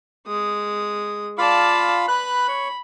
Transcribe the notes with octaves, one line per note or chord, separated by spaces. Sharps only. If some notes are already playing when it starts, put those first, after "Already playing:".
G#3 D#6
F4 D5 F5 A5 B5
B4 B5 F#6
C#5